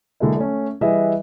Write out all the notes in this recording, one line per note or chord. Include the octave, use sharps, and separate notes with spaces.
D3 F#3 G#3 A#3 E4
A3 C#4
E3 G3 G#4 B4 D#5 E5